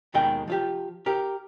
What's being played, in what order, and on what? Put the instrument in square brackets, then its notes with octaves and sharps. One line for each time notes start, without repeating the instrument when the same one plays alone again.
[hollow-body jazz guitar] D#2 B2 D#3 G#3 G5
F3 F4 G4
G4 A#4